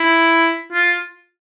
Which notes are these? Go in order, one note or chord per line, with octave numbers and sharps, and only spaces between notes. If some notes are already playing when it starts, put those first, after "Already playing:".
Already playing: E4
F4